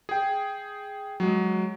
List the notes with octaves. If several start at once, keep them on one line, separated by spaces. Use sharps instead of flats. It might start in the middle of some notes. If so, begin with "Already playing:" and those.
G#4 G5
F#3 G#3